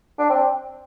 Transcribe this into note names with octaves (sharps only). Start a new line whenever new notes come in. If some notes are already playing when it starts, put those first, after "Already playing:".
D4
C4